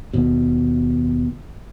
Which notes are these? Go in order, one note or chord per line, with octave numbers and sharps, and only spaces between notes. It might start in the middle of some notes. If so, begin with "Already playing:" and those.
D#2 B2